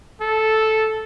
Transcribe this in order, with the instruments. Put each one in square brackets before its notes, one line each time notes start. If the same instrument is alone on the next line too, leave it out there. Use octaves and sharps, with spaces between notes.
[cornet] A4